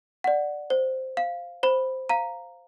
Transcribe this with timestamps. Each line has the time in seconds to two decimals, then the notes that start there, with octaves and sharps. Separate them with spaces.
0.24 D5 F#5
0.70 C5
1.17 F5
1.63 C5 B5
2.09 F5 A#5